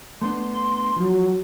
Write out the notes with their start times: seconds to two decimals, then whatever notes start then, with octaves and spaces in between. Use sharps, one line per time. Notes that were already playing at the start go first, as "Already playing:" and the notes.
0.22 A3 B3 D4 C6
0.96 F3 F#3